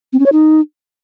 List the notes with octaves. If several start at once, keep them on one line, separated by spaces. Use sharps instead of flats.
C4
C#4
C#5
D#4